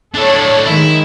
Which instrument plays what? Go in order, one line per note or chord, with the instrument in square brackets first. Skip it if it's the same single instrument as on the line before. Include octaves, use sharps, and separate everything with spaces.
[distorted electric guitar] D4 E4 [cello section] A4 C#5
[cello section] D#3 G#3 [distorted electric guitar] E4